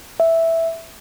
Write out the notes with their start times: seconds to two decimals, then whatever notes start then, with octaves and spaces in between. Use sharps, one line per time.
0.20 E5